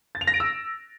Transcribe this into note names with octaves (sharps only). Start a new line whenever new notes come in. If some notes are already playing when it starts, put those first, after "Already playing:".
A6
F7
A#6
D7
E6